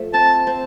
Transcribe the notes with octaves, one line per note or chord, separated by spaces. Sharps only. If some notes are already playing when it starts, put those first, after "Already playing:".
Already playing: F3 A3
C4 A5
C4